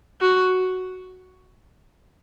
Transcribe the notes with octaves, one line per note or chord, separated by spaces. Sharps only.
F#4